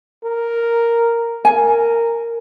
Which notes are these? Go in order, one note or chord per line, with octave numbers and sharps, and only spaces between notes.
A#4
A#4 G#5